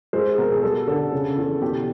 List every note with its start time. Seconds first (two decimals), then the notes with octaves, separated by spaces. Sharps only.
0.13 G#3 C5
0.38 B2 A#4
0.51 G#4
0.62 G3 A4
0.87 D3 A4
1.12 C#3
1.37 E2
1.62 B2 G4